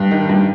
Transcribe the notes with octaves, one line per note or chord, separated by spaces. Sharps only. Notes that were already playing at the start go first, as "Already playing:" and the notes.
Already playing: G2
D#3
G2